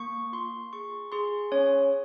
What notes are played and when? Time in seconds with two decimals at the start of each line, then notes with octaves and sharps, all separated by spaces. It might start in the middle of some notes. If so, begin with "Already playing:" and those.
Already playing: A#3 C#6
0.32 F4 C6
0.73 G#4 C#6
1.12 G#4 C6
1.52 C#4 C#5